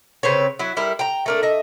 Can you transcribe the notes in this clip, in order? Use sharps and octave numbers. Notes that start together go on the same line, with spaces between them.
C#3 C4 B4 C#5
F#3 E4
G3 E4 A#4
G5 A#5
A3 A#3 D4
D#5 E5